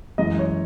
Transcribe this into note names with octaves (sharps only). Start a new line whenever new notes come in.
F#2 E3 G#3 D#5
C#5